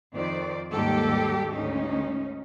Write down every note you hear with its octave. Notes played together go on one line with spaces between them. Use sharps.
F2 D#3 C5 D5
D#2 G#2 D#3 G3 G4 A4
D2 G#2 C#4 D#4